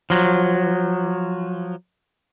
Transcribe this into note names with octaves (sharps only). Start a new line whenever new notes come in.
F3 F#3